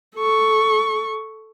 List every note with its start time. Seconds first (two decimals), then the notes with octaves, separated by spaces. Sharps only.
0.17 A4 C#6